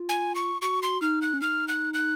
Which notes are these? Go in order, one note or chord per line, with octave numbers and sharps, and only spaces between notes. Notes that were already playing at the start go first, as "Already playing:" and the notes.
Already playing: F4
G#5
C#6
F#4 C#6
C6
D#4 F6
F#6
C#4
D#4 F6
F#6
F#6